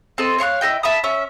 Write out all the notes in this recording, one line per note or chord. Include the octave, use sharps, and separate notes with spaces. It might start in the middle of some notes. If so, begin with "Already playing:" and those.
C4 A4 D#5
C#5 F5 C#6 F#6
E4 A4 D#5 G5
E5 A5 B5 D#6
C#4 E5